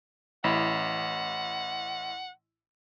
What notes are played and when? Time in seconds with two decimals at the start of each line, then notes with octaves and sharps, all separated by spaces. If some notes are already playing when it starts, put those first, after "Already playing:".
0.44 A1 E4 F#5 B5